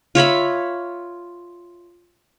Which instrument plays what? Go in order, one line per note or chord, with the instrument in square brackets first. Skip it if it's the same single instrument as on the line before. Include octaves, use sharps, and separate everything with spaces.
[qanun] F4 C#5 E5 B5